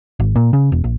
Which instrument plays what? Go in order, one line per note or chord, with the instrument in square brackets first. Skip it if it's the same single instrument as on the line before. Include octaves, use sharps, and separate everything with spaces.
[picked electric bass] G#1
A#2
C#3
E1
A#1